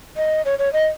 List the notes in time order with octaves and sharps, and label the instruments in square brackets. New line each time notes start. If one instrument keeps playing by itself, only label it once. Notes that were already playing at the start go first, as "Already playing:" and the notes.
[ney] D#5
C#5
C#5
D#5